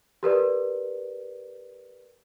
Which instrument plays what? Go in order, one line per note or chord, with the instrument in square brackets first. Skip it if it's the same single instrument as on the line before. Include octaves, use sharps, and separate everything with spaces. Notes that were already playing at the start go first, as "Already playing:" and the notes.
[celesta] G4 A#4 B4 D5